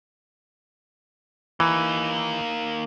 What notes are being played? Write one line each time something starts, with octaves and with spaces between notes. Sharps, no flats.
E3 A#3 D#4